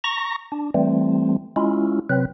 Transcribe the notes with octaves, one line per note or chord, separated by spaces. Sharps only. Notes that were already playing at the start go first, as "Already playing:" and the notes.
A#5 C#6 A#6
D4
E3 G3 A3 C4
G#3 C#4 E4 F4
C3 F#3 C4 B4